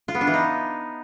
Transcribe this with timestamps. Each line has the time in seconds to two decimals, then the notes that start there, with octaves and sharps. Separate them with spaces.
0.08 F4
0.15 B3
0.21 D4
0.27 E3
0.34 D#4